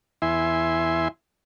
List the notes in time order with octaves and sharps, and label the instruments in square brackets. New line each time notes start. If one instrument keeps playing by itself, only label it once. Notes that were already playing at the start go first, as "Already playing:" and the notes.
[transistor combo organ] E2 E4 E5 G#5 C6